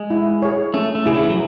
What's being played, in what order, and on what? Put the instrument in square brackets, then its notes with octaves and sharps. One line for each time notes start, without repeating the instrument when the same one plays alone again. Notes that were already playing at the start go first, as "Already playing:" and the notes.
Already playing: [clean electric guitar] G#3
[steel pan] E4
G#4 C#5
[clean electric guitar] A3 [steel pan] C#4
[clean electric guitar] A3
[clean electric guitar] C#3 [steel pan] E4 G#4
[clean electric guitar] D3
E3
F#3